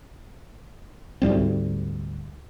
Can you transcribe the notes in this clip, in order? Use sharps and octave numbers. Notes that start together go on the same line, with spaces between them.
D2 G#2 G3 C4